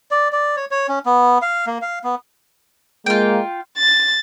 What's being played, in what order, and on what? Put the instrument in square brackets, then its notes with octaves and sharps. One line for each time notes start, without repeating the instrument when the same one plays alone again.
[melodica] D5
D5
C#5
C#5
C#4
B3
F5
A#3
F5
B3
[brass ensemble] G#3 A#3 [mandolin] F4 G5
[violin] A6